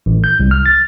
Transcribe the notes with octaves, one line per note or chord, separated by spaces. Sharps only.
A1
G6
C2
F6
A6